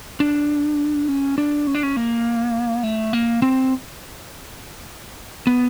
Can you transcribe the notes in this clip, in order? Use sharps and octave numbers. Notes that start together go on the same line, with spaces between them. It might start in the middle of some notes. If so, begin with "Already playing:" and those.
D4
C#4
D4
C#4
D4
C#4
A#3
A3
A#3
C4
B3